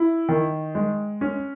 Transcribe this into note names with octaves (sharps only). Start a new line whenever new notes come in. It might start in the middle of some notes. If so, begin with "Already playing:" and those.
Already playing: E4
D#3
G#3
C#4